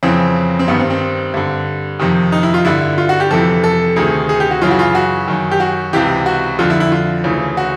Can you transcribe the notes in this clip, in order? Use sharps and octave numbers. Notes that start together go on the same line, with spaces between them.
F2 C#3 E3 C4
C4
G2 D#3 B3
C4
C4
G2 D3
F2 C3 D#3
D#4
E4
F4
G2 D3 E4
F4
F#4
G4
F2 C3 E3 A4
A4
D2 C3 D#3 G#4
G#4
G4
F#4
F#2 C#3 E3 F4
F#4
F4
F#4
F#2 D#3
G4
F#4
C#2 C3 E3 G4
F#4
F2 D3 F4
E4
E4
F4
D2 C#3 E3
F#4